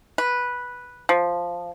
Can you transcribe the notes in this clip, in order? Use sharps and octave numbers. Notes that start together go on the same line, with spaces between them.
B4
F3